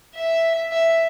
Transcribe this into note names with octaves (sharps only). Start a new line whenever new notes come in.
E5
E5